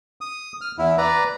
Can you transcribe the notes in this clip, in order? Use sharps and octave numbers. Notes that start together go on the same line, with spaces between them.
D#6
F6
E2 E4
B4 D5 A#5